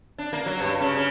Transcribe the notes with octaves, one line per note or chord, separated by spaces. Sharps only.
D4
A#3
F#3
G2
C#3
C#3